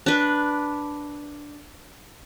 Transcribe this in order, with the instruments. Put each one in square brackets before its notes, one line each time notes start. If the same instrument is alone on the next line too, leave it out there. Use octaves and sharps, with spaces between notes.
[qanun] D4 B4